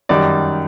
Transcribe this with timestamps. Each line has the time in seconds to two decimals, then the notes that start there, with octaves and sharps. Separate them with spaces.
0.09 F#2 D#3 G3 D5